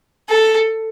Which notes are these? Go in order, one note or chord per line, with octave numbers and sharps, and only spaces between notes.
A4